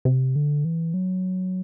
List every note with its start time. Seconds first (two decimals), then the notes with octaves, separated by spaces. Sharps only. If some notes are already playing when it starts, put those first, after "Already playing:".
0.05 C3
0.36 D3
0.65 E3
0.94 F#3